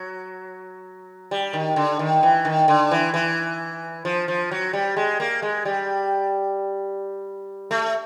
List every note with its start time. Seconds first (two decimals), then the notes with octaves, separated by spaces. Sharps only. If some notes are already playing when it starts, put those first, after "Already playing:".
Already playing: F#3
1.31 G3
1.53 D#3
1.76 D3
1.99 D#3
2.23 E3
2.45 D#3
2.68 D3
2.91 E3
3.14 E3
4.05 F3
4.28 F3
4.51 F#3
4.73 G3
4.97 G#3
5.20 A#3
5.42 G#3
5.65 G3
7.71 A3